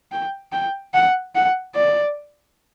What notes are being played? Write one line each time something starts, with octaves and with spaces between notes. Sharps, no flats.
G5
G5
F#5
F#5
D5